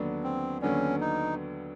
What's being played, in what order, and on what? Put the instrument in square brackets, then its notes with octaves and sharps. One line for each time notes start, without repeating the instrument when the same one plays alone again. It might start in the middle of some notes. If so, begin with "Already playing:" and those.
Already playing: [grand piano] D#2 D3 F#3 B3 D4
[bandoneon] C4
[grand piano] D#2 D3 F#3 B3 D4 [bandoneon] C#4
[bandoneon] D#4